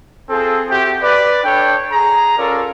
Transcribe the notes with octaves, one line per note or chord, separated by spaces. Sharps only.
C4 F4 G#4 A4
C4 F#4 G4 E5 G5
B4 D5
D4 A4 C#5 G5
G#4 A#5
C#4 F4 A4 A#4 D5